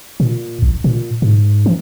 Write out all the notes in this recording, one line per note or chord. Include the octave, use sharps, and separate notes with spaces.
A#2
A#1
A#2
G#2
E3